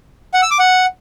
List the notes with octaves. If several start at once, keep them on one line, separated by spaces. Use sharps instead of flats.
F#5
E6
D6
F#5